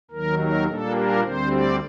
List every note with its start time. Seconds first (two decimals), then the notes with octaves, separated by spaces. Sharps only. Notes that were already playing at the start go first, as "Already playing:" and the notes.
0.11 D#2 D#3 F#3 A#4
0.39 A#4
0.67 A#2 G3 A#3 D4 A4
0.95 A#4
1.23 D2 D3 G3 C4 C5
1.51 D5